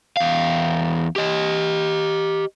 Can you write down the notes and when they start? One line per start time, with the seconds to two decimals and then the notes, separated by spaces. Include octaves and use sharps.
0.17 E2 F5
1.16 G4 D#5